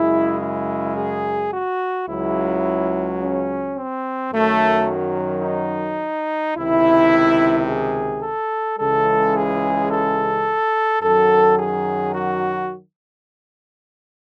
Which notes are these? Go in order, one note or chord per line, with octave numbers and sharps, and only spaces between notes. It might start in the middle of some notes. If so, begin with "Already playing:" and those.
Already playing: F#2 C#3 G#3 E4
E4
G#4
F#4
C#2 C#3 F#3 E4
C#4
C4
F#2 D#3 F#3 A3
D#4
C#2 C3 D#3 E4
G#4
A4
C#2 C#3 E3 G#3 A4
G#4
A4
F#2 D#3 F#3 A4
G#4
F#4